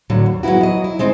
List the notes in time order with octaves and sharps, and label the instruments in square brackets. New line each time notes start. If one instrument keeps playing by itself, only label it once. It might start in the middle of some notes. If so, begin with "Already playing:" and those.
[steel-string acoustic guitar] A2 D3 F#3
D#2
F#3 G#3 B3 E4 F#4
F#3 D#5
E4
G#3 C4 D#4